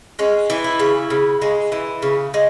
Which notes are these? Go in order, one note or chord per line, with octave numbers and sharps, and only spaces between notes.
G#3 C#4
E3
E4
C#3
C#3
G#3
E3
C#3
G#3